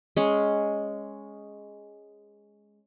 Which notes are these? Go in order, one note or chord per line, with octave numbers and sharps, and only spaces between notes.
G#3 C#4